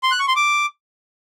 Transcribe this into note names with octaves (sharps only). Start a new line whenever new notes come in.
C6
F#6
C#6
C6
D6